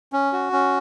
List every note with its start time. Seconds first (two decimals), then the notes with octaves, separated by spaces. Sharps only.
0.13 C#4
0.33 F#4
0.53 C#4